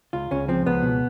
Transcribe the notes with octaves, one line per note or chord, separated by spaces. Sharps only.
C#2 F4
C#2 C#4
F3 C4
C#2 B3
B2